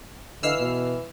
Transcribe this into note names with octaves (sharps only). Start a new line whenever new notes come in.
D3 E3 B4 D#5 F5 E6 F6 C7
B2